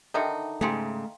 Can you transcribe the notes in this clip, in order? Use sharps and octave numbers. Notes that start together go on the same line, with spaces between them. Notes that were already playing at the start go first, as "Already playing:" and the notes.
D3 D#3 D#4 A4 E5 G5
G#2 C#3 A3 F5 G5 C6